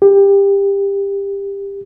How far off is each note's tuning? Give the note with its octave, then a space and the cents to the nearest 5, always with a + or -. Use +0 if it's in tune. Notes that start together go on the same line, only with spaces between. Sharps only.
G4 +20